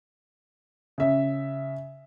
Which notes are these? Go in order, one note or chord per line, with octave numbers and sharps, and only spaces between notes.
C#3 E5